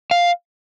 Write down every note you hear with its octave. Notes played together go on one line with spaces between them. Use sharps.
F5